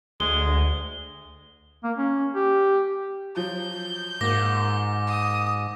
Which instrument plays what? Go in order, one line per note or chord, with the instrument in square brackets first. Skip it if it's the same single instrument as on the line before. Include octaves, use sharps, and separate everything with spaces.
[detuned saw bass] D2 [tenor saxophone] G#3 [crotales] G7
[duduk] A#3
C#4
G4
[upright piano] F3 F#3 [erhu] G6
[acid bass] G#2 [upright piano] A#3 F#4 [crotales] D6 A#6
[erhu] D#6